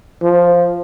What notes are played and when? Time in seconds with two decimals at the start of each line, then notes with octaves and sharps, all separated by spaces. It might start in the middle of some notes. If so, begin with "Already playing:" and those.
0.22 F3